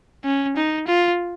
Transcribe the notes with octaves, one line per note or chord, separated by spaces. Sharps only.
C#4
D#4
F4